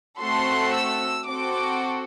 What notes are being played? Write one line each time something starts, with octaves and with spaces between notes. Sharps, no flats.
A3 C4 F#4 A4 C6
E6
C4 F#4 A4 D6